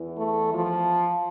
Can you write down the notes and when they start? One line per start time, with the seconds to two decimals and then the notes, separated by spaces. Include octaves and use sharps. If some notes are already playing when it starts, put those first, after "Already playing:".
Already playing: E2 E3
0.18 A3
0.54 F3